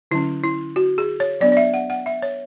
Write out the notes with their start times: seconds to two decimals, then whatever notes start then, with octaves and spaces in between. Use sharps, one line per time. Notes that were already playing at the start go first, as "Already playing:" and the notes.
0.11 D3 F#3 C#4 E4
0.43 E4
0.76 F#4
0.98 G#4
1.20 C#5
1.41 F#3 B3 D4 D5
1.52 D5
1.57 E5
1.74 F#5
1.90 F#5
2.06 E5
2.22 C#5